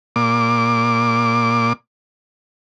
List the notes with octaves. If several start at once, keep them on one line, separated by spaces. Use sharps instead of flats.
A#2 D6